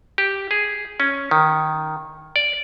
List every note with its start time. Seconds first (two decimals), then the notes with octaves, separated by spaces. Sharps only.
0.18 G4
0.51 G#4
1.00 C#4
1.31 D#3
2.36 D5